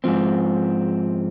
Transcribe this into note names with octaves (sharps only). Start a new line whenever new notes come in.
G#2 F3 C4